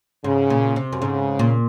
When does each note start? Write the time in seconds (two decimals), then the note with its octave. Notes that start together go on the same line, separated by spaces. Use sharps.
0.24 G#2 C#3
0.50 A#2
0.76 C3
0.93 F#2
1.01 G#2 C#3
1.39 A#2